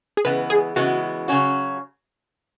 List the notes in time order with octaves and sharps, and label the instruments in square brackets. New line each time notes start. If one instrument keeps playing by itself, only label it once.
[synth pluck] G#4
[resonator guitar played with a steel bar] C#3 E3 G#3 B3 [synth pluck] B4
[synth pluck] G#4
[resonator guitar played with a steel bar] C#3 E3 G#3 B3 [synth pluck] F#4
[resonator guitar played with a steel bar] C#3 F#3 C#4 F#4